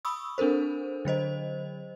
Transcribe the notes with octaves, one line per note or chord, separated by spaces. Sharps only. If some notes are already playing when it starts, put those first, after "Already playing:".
B5 C#6 D#6 E6
C4 D4 A4 A#4 C5
D3 F#3 C5 D#5